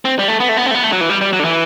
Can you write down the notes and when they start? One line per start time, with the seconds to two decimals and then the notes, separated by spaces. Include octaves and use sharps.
0.05 C4
0.19 G3
0.28 A3
0.40 B3
0.49 A3
0.57 B3
0.66 C4
0.71 A3
0.75 B3
0.84 A3
0.92 F#3
1.01 E3
1.10 G3
1.21 G3
1.33 F#3
1.39 D3
1.45 E3